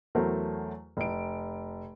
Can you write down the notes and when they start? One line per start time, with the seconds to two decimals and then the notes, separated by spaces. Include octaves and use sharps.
0.15 E2 F#3 A3 A#4 C5 A5
0.97 F1 D7